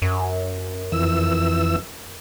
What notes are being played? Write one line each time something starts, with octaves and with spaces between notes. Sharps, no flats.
F#2
F2 E3 E6